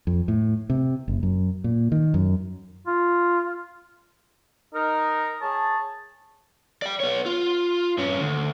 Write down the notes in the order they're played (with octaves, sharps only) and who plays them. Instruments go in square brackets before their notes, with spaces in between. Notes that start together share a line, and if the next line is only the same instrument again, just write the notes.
[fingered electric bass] F2
A2
C3
F#1
F#2
A#2
D#3
F#2
[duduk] F4
[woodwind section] D#4 A#4
G#4 C#5 A5
[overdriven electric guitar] D5 G5
B3 C#5
F4
G2 C#4
D2